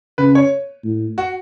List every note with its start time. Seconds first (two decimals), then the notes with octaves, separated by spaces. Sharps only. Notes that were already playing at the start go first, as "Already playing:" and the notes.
0.18 C#3 B4
0.35 C#5
0.84 A2
1.18 F#4